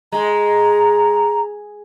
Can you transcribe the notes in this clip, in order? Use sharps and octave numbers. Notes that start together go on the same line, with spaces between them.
G#3 A#5